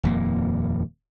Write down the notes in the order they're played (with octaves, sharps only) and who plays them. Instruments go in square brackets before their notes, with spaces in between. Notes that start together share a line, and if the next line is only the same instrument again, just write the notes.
[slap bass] D#1 F2 A#3